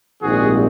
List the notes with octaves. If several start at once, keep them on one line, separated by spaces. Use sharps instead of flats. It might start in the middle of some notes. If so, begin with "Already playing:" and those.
A#1 G#2 D#3 G3 C4 F#4 G#4